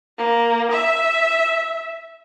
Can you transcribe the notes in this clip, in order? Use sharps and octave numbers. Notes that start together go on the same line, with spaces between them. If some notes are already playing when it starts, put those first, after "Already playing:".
A#3
E5